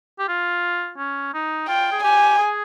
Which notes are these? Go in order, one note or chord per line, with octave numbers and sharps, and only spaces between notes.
G4
F4
C#4
D#4
F4 G5
G#4
G4 G#5
G#4